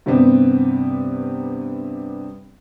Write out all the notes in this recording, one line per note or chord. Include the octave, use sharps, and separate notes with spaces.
G2 C3 G3 B3 C4